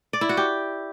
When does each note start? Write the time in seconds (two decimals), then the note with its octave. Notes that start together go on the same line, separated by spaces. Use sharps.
0.13 D5
0.21 E4
0.29 F#4
0.37 G4